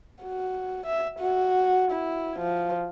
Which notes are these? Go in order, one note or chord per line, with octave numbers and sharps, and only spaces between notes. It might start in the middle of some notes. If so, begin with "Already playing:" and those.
F#4
E5
F#4
E4
F3